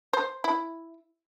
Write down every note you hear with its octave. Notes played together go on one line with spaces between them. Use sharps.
C5
E4